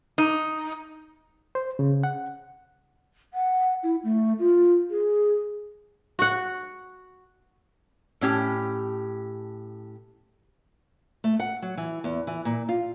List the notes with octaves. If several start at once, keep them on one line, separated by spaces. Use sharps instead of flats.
D#4
C5
C#3
F#5
F#5
E4
A3
F4
G#4
F#4 F#5
A2 C#4 G4
A3
F#5
F#3
E3
E2
E3
A#2
F4